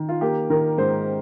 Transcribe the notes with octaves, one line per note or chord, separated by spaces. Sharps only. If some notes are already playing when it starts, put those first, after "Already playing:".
Already playing: D#3
F4
A#3 G4
D#3 A#4
G#2 C5